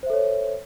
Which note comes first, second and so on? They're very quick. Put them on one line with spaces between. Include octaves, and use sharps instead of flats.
C5 E5 A4 C#5